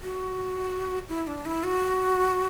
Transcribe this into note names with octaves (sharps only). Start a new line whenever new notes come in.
F#4
E4
D4
E4
F#4